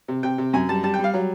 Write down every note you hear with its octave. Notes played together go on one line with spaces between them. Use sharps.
C3
C3 G5
C3
F#2 G#5
G3 A5
G3 A5
G5
G3
F5
F#3